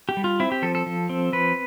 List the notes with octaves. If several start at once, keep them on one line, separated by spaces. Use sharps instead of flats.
G4
G3
F4
C4 E4
G4
F3 A4
A4
F3
C4
F3 B4